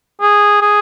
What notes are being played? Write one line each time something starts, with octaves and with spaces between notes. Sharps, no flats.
G#4
G#4